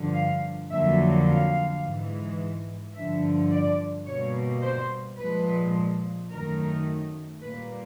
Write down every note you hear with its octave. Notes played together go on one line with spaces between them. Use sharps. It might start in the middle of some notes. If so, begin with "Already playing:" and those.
Already playing: G2 D3 F3
F5
F2 D3 F#3 A#3 E5
F5
G#2 E3 G#3
G2 D3 F3 E5
D5
B2 G3 A#3 C#5
C5
A#2 F3 G#3 B4
F#2 D#3 F#3 A3 A#4
A#2 G3 A#3 B4